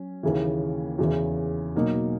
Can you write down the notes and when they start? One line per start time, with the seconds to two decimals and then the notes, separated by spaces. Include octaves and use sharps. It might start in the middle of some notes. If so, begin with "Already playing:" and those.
Already playing: F#3 C#4
0.23 D#2 C#3 E3
0.98 E2 C#3 E3
1.75 B2 F#3 A#3 D#4